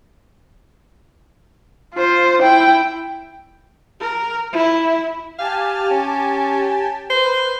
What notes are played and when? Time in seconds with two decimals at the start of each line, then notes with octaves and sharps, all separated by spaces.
1.94 F4 C5
2.41 E4 G5
4.00 A#4
4.53 E4
5.39 G4 F5 G#5 A5
5.91 C#4
7.10 B4 C5